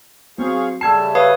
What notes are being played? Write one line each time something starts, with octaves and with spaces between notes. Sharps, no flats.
F#3 C4 G#4 F5 C#6
C#3 G3 A3 A5 E6 G#6 C7
B4 C#5 F5 D#6